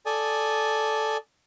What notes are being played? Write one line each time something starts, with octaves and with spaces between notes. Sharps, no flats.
A4 D5 G#5 D#6